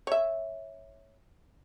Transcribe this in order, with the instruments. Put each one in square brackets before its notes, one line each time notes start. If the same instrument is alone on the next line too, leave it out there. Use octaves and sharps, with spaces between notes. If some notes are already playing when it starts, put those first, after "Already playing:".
[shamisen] C#5 E5